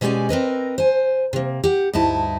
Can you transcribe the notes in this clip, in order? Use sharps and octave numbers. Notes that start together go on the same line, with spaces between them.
B2 G#3 C#4 G4 D5 G#5
C4 A#4 B4 D#5
C5 G#5
C3 A#3
G4 F#5
D2 G2 D#4 E4 A5